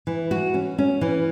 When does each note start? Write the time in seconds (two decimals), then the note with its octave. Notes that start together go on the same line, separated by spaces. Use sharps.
0.07 E3
0.31 F#4
0.54 C#4
0.78 C#4
1.01 E3